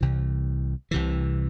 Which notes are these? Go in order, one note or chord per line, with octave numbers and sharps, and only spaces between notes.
C2 C3 E3
C2 C3 E3